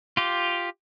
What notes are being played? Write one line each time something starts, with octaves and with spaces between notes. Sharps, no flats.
F4 G4